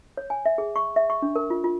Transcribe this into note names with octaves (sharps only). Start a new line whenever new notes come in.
C#5
G#5
E5
G#4
C#6
E5
C#6
D4
A#4
F4
F4